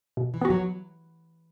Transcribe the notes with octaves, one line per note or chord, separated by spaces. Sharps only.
B2
E3
B3 F#4
F#3